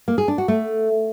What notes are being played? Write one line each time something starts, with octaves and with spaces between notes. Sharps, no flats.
A#3
G#4
D4
F#4
A3